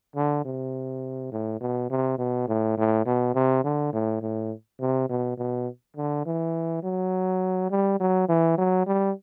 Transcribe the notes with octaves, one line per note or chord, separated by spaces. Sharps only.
D3
C3
A2
B2
C3
B2
A2
A2
B2
C3
D3
A2
A2
C3
B2
B2
D3
E3
F#3
G3
F#3
E3
F#3
G3